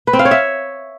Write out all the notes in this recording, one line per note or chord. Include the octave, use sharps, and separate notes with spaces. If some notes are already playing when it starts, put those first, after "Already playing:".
B4
C4
F5
C#5
E5